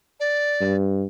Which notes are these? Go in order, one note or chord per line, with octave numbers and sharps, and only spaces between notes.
D5
G2